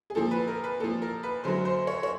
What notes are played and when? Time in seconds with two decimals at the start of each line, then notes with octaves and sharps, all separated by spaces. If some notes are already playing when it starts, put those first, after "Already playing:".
0.10 G#4
0.15 A#2 F3 A4
0.31 B4
0.47 A#4
0.64 B4
0.80 A#2 F3 A4
1.02 A#4
1.23 B4
1.44 F#2 D3 F#3 C5
1.65 C5
1.87 C#5
2.03 C#5